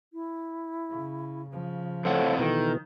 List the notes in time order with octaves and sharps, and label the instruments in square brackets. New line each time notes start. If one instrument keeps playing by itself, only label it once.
[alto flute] E4
[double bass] C#3
C#3 F3
[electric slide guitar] F2 A2 F#5 [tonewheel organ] A4 C5 [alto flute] C#5
[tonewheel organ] B2 E3 [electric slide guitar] D#3 [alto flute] A4